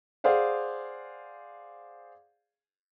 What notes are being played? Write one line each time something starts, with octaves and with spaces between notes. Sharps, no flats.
G#4 C5 D5 F5 F#5